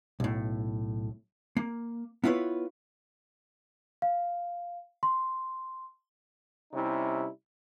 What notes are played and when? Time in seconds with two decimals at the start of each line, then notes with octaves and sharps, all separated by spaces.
0.20 B1 A2
1.57 A#3
2.24 B3 E4 F4 B4 C#5
4.02 F5
5.03 C6
6.73 C3 G3 C#4 D#4 E4